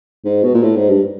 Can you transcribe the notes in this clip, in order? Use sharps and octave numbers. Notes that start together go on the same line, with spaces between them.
G#2
B2
A#2
A2
G#2
G2